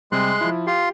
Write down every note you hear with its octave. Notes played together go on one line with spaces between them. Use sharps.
C3 G3 G#3 C6 F#6
F3 E4
F4 G4 C6